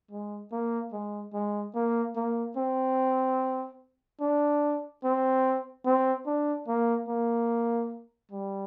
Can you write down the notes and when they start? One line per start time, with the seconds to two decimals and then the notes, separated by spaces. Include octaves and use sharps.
0.11 G#3
0.52 A#3
0.93 G#3
1.33 G#3
1.75 A#3
2.16 A#3
2.57 C4
4.21 D4
5.04 C4
5.85 C4
6.26 D4
6.68 A#3
7.08 A#3
8.31 G3